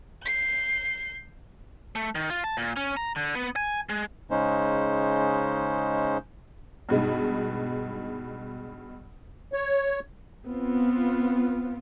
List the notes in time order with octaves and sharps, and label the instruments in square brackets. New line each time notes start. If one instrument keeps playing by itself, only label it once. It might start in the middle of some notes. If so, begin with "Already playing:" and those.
[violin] G6 C7
[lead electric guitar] A3
D#3
F4
A5
A#2
C#4
A#5
D3
B3
G#5
G#3
[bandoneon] C#3 G#3 C#4 D#4 C5
[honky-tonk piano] G2 B2 G#3 D#4
[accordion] C#5
[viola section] B3 C4 F4